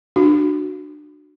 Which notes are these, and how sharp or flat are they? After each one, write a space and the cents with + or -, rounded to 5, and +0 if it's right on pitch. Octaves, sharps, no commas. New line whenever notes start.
D4 +25 F#4 +0